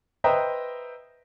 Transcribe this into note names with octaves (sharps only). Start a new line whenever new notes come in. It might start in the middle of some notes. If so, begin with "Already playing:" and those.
B4 C5 D#5 E5 G5 A#5